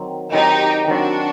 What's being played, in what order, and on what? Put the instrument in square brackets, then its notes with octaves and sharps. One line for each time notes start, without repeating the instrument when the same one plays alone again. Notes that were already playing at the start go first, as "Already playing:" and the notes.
Already playing: [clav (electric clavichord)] D#3 F#3 C4
[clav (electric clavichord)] D#3 F#3 C4 [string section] D#4 G4
[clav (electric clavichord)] D#3 F#3 C4 [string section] D4 F#4